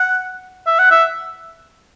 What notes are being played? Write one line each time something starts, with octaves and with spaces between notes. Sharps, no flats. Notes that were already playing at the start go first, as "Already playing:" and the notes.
Already playing: F#5
E5
F#5
E5